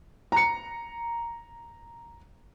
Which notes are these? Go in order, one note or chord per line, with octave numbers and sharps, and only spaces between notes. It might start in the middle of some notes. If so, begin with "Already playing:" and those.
A#5 C#7